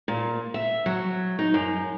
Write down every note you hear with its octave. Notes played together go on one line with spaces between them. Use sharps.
A#2
E5
F#3
D#4
F#2